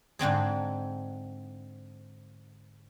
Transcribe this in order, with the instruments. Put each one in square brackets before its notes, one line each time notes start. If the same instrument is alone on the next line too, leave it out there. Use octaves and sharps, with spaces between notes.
[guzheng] G#2 D3 C4 G#4